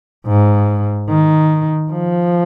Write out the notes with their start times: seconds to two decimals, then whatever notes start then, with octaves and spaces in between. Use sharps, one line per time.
0.27 G#2
1.09 D#3
1.92 F3